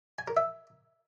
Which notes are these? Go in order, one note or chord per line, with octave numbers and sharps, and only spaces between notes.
G#5
A#4
E5